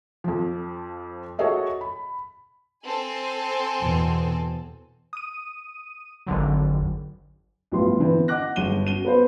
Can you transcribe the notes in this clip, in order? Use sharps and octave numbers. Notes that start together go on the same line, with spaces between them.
F2 F3
F#4 G#4 A4 C#5 D#5 E5
B5
C4 A4 G#5
E2 B2
D#6 D#7
G#1 F2 D3 F#3
B1 A2 F3 G3 B3 C6
D3 E3 B3 C4
D#5 F#5 D6 F#6 A#6
G1 G#3 D#7 G7
F#4 D#7 G7
B3 B4 C5